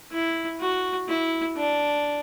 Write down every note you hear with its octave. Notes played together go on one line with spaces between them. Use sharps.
E4
F#4
E4
D4